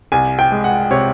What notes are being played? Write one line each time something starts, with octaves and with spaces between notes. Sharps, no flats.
C2 G#5
G5
G#3
F#5
C3 C#5